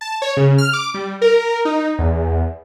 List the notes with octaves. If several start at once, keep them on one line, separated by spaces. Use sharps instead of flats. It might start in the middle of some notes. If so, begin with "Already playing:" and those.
A5
C#5
C#3
F6
D6
G3
A#4
D#4
E2